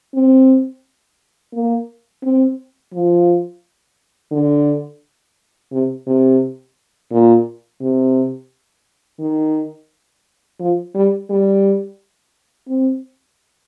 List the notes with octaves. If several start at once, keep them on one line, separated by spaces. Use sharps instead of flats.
C4
A#3
C4
F3
D3
C3
C3
A#2
C3
D#3
F3
G3
G3
C4